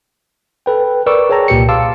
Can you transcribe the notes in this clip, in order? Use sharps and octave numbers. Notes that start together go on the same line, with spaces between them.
A4 B4 G5
A#4 B4 D5 C#6 D6 E6
G#4 C#5 G5 A5 A#5
C2 A#2 G4 G5 C#7
F5 A5 C6 D6 E6